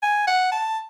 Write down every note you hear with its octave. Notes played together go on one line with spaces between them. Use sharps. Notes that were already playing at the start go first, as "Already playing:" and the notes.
G#5
F#5
A5